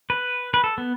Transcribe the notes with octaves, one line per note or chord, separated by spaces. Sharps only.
B4
B4
A4
B3